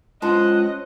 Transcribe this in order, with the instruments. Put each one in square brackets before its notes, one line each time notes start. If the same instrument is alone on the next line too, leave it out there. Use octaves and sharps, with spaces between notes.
[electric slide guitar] G#3 F4 A5 [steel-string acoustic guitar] C#4 C5 [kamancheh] D#5 [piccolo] F#6